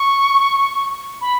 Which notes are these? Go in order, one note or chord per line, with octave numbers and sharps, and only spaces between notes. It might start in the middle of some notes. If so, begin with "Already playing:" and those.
Already playing: C#6
B5